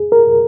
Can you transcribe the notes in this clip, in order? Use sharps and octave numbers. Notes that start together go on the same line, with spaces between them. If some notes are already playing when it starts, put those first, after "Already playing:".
Already playing: G#4
A#4